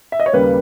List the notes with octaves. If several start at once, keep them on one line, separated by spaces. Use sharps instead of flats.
E5
D#5
C#5
D#2 C#3 G3 A#3 B4